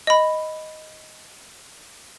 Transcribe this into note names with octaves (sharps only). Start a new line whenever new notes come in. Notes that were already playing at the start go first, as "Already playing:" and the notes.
D#5 B5